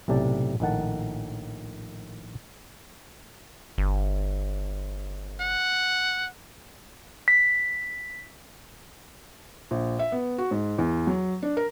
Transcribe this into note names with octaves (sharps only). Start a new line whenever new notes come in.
B1 A2 C3 D5 A5
A#1 A2 D#3 F#5 A5
G1
F#5
B6
A#1
E5
B3
F#4
G#2
E2
F#3
D4
A#4